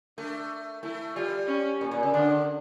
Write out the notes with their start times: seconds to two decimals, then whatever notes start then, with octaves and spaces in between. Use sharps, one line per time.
0.18 A3 D4
0.83 A3 E4
1.16 G3 F4
1.48 C#4
1.81 A#2
1.91 A#2
2.03 C#3
2.14 D3 D4